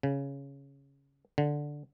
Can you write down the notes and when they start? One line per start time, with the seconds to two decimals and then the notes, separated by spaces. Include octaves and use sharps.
0.03 C#3
1.38 D3